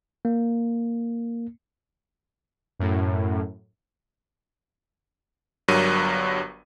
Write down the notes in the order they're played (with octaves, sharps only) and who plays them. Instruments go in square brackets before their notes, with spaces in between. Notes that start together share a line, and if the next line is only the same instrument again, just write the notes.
[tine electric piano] A#3
[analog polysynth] F#2 A2
[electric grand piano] G1 G2 F#3 A#4 D#7